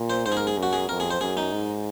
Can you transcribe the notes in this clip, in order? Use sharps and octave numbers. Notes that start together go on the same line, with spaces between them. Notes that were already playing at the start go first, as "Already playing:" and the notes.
Already playing: A#2
C5
G#2 C5
G#4
A#4
G#4
F#2
F#4
G#4
F2 A#4
G#4
C5
F#2 G#4
D#4
G#2